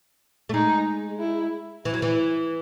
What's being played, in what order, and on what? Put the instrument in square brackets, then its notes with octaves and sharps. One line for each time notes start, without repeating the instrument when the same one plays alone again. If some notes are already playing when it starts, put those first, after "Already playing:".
[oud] A3
[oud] G#3 [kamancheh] D#4
[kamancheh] E4
[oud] E3 [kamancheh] E4
[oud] F#3
E3